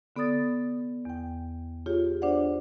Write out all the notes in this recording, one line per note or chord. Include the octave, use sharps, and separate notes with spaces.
D3 B3 A4 D5 D#6 A6
E2 G5
F4 G4 G#4 C#5
D4 C5 D5 F#5